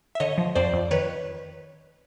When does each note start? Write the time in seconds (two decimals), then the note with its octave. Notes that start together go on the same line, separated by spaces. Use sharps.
0.15 E5
0.20 D3 C#5 D#5
0.38 F3
0.55 F2 C5 D5
0.73 F2
0.91 D#3 B4 C#5